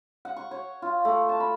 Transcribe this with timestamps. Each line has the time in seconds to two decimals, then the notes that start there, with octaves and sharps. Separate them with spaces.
0.25 F#5
0.37 C#6
0.51 C#5
0.82 F4
1.05 A3
1.29 A5
1.40 B5